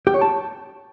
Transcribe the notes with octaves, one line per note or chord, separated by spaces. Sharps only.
G4
C#5
A5